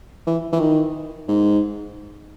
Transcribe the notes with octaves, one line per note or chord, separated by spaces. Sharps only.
E3
E3
D#3
G#2